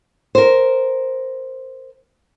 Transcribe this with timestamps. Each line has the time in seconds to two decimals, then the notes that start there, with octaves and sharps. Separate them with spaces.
0.35 A#4 C5